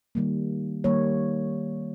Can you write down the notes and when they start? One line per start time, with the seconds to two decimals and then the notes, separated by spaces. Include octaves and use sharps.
0.15 D#3 G3 A#3
0.84 D#3 G3 A#3 C#5